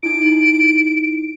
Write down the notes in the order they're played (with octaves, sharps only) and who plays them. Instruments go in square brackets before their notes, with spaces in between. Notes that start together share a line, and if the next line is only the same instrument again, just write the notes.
[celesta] D#4 E4 [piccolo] D7